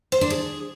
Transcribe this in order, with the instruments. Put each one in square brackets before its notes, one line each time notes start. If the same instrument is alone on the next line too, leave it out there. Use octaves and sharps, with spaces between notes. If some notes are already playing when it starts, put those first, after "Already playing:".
[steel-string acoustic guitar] C5
D4
G#4